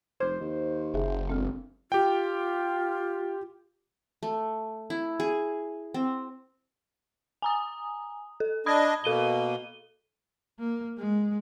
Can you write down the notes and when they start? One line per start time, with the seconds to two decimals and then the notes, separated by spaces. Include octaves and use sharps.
0.20 F1 C5 D6 F6 G#6
0.40 D#2
0.94 F#1 G#4 E5
1.29 E1 C4 A4 F6
1.92 F4 G4 G5
4.23 A3
4.90 E4
5.20 G#4
5.94 C4
7.42 G#5 A#5 D#6
8.40 A4
8.66 D4 D#5 B5 D#6 G#6
9.04 B2 A#3 A4 D#7 G7
10.59 A#3
10.98 G#3